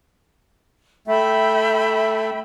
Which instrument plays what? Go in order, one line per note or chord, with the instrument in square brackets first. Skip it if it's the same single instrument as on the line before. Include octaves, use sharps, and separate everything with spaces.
[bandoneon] A3 [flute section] E5 G5 B5